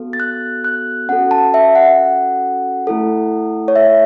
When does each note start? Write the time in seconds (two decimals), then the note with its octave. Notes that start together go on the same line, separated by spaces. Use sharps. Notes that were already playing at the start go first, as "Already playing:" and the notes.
Already playing: B3 F#4 A4
0.13 A6
0.20 F#6
0.64 F#6
1.09 C#4 F#4 A4 F#5
1.31 A5
1.54 E5
1.75 F#5
2.87 A3 E4 A4
3.68 C#5
3.76 E5